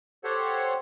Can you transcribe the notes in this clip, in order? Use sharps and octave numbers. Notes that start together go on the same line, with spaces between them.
G4 A4 C5 C#5 F#5